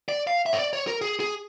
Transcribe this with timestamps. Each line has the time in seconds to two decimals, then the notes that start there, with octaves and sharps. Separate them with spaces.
0.09 D5
0.27 F5
0.46 E5
0.53 C#5
0.59 D5
0.73 C#5
0.87 A#4
1.01 G#4
1.20 G#4